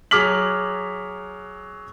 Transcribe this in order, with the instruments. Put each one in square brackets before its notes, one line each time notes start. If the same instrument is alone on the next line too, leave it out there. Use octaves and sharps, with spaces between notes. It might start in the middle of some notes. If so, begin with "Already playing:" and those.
[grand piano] F#3 G#4 D6 F6 B6 F#7